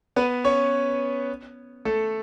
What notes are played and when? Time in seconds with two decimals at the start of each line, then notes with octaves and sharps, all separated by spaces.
0.16 B3 B4
0.44 C#4 C#5
1.85 A3 A4